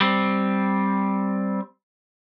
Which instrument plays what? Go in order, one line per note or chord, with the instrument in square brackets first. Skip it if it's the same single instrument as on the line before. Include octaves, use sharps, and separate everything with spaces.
[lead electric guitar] G3 C4